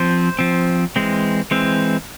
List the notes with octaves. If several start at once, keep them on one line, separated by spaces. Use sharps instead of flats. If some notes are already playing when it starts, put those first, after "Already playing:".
Already playing: F3 C4 C5
F3 C4
E3 G#3 C4
E3 G#3 C4